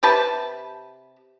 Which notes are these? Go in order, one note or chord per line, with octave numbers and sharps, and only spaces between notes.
C3 G4 B4 A5